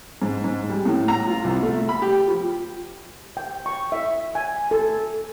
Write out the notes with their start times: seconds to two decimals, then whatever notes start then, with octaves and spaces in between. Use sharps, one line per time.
0.22 G#2
0.44 G#2
0.70 G3
0.85 A2
1.08 A#5
1.27 F4
1.44 C2
1.63 A3
1.89 B5
2.02 G4
2.28 F3
3.37 G5
3.66 C#6
3.92 E5
4.35 G#5
4.71 A4